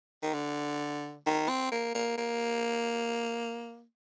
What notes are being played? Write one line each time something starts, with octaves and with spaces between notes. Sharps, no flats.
D#3
D3
D#3
C4
A#3
A#3
A#3